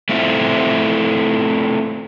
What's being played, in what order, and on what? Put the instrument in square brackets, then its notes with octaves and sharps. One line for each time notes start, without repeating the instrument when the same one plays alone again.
[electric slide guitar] A3 C4 E4 F4